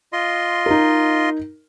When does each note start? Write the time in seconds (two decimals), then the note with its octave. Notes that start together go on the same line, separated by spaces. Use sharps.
0.13 F4 D#5 C6
0.66 D#4 A#4